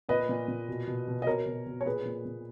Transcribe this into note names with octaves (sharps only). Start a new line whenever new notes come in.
A#2 B4 D#5
A#2
A#2
B2
B2
B2
D#5
B2 A#4 C#5
B2
B2
C#5
A#2 G#4 B4
A#2
A#2